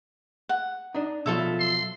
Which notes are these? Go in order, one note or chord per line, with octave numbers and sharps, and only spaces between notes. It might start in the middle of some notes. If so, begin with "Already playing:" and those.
F#5
D4 D#4
B2 F3 F#3 F4 A4 E5
C6